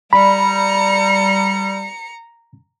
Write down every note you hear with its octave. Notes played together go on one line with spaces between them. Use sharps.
G3 A#5 B5 C#7